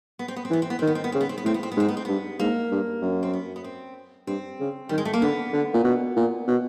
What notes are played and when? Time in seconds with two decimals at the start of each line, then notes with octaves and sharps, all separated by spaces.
0.19 B3
0.28 C4
0.36 B3
0.45 C4
0.50 E3 B3
0.62 C4
0.70 B3
0.79 D#3 C4
0.87 B3
0.95 C4
1.04 B3
1.12 C#3 C4
1.21 B3
1.29 C4
1.38 B3
1.45 A2 C4
1.54 B3
1.63 C4
1.72 B3
1.77 G#2 C4
1.88 B3
1.97 C4
2.05 G2 B3
2.39 G#2 A#3
2.71 G2
3.02 F#2
3.23 C4
3.33 B3
3.56 B3
3.64 C4
4.27 G2 C4
4.60 C#3
4.89 D#3 G3
4.98 G#3
5.05 A3
5.13 A#3
5.22 D3 B3
5.53 D3
5.74 A#2
5.84 B2
6.16 A#2
6.47 B2